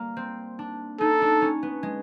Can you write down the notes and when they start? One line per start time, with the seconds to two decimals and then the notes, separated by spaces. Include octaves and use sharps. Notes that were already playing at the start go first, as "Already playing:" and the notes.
Already playing: G3 A#3
0.17 C4
0.59 D4
1.00 D#4 A4
1.22 D4
1.42 C#4
1.63 B3
1.83 G#3